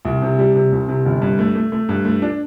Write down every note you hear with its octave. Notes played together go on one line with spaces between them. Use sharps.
C2
C3
G3
C3
C2
C3
G1
G2
A3
A3
A3
G2
A3
D4